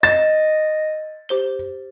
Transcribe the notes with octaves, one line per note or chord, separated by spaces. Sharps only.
D#5 A6 E7
G4 C5 G7